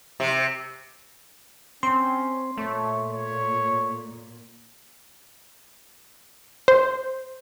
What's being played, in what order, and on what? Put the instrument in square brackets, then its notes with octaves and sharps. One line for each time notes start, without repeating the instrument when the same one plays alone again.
[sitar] C3
[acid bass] C4 [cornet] C#4 [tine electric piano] C6
[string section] A#2 [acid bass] A3 [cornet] C#5
[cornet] C#5
[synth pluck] C5